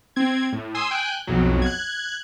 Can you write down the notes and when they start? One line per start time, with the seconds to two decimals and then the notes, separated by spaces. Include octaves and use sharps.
0.16 C4 G#6
0.53 A2
0.74 G#5 C6 D#6 E6
0.91 G5 G#5 F#6
1.27 B1 F2 F#3
1.62 F#6 G#6